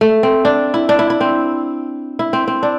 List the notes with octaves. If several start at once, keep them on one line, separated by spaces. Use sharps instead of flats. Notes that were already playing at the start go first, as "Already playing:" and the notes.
A3
C4
D4
E4
D4
E4
E4
C4
E4
C4
C4
D4